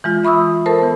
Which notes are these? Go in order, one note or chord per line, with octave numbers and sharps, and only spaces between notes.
E3 G#3 F4
E5 B5 C#6 D#6 E6
A4 A#4 C5 A5
E3 B3